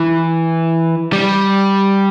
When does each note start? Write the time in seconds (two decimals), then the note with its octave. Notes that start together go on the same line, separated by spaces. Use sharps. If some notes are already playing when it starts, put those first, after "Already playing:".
Already playing: E3
1.13 G3